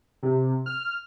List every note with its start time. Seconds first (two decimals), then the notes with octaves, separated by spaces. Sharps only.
0.23 C3
0.66 F6